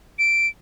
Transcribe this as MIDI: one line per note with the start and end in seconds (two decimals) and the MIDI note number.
0.19 0.47 98